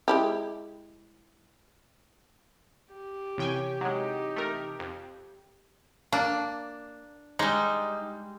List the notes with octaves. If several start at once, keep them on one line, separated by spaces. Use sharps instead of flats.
G#3 E4 G4
G4
A1 C3 E3 C#5 G5 G#5
F#3 G#3 D#4
A3 A#4
F2
A#3 D4
G3 G#3 D#4